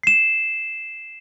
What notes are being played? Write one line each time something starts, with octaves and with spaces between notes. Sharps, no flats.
C7 E7